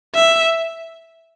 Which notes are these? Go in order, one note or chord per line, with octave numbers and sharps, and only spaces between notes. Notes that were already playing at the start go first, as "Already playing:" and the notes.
E5